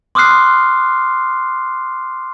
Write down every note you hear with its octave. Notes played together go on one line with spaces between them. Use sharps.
C6 D6 D#6 F6 F#6 C7